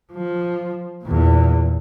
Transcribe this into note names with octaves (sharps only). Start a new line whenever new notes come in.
F3
E2 A#2